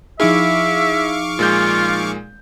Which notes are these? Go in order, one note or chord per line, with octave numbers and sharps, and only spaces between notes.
F3 D#4 E4 G#4 E5 F5 C#6 D6
A#2 G#3 F4 G6